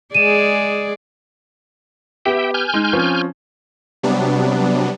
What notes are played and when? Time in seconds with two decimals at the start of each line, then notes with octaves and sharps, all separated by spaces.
0.15 G#3 G#4 D5 D#7 E7
2.26 B3 G4 E5 G5
2.54 G#5 F6 G6
2.74 G#3 D#4
2.93 F3 C4 C#4
4.03 C3 F#3 G3 B3 D4